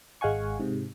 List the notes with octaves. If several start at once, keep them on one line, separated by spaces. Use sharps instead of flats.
G#1 G#3 F5 F#5 G#5 C#6
G#2 C3